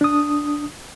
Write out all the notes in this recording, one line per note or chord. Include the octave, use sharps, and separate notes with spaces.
D4 D#6